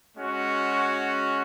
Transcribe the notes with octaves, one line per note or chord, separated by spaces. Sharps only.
G#3 C#4 F#4